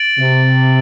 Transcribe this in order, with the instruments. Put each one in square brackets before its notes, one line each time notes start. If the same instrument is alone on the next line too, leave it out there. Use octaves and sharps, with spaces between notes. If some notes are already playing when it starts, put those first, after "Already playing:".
Already playing: [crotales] A6 D7 F#7
[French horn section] C3